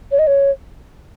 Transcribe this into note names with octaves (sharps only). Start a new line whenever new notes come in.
C#5
D#5
C#5